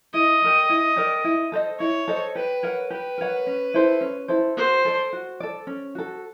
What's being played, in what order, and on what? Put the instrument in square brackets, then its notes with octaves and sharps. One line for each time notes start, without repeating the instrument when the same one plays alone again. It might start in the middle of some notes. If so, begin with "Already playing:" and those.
[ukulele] E4 [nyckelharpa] D#5
[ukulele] G4 A#4 D5
E4
G4 A#4 D5
E4
A4 C5 D#5
[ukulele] E4 [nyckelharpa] C#5
[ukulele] A4 C5 D#5
[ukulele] G4 [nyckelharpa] B4
[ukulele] A#4 C#5 F#5
[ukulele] G4 [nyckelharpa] B4
[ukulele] A#4 C#5 F#5
C#4
E4 A4 C5
C#4
E4 A4 C5
[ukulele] F#4 [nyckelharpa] C5
[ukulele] A4 D5
F#4
A4 D5
C#4
F#4 A4